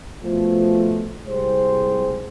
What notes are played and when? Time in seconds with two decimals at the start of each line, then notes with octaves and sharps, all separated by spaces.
0.23 B2 F3 A3
1.27 C2 G#3 C4 C5